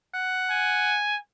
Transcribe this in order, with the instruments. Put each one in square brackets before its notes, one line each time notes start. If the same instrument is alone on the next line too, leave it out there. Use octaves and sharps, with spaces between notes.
[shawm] F#5
[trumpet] G#5